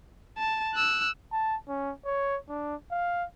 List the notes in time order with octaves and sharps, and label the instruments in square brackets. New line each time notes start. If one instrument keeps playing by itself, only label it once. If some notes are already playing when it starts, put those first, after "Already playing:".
[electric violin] A5
E6 F#6
[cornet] A5
C#4
C#5
D4
F5